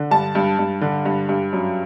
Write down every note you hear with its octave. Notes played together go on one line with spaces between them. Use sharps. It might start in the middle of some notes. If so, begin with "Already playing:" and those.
Already playing: D3
G2 A5
G2
G2
D3
G2
G2
F#2